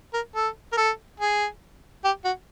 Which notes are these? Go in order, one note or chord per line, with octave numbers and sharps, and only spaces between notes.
A#4
A4
A#4
A4
G#4
G4
F#4